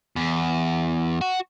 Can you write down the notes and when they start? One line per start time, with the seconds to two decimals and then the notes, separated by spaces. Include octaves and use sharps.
0.16 E2
1.21 F#4